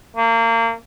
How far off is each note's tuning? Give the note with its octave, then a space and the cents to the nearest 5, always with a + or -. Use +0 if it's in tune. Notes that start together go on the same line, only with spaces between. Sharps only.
A#3 -30